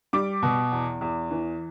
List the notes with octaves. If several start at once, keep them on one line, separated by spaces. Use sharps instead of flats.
G3 D6
B2
E2
E2
E3